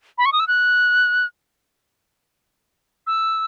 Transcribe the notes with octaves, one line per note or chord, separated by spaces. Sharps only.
B5
C#6
D#6
E6
F#6
E6